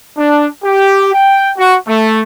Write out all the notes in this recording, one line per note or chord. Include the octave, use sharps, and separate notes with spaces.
D4
G4
G5
F#4
A3